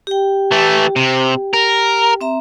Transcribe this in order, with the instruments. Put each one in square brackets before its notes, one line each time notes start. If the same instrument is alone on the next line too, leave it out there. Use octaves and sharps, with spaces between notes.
[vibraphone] G4 G5
[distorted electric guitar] E3 A3
C3
A#4
[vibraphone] C4 E5 A#5